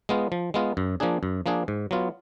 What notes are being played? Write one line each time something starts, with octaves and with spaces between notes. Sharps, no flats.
G#3 B3 F4
F3
G#3 B3 F4
F#2
F3 A#3 D4 G#4
F#2
F3 A#3 D4 G#4
G#2
F#3 B3 F4